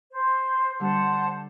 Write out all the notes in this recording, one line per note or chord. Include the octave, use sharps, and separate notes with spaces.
C5
D3 G3 C5 F#5 A5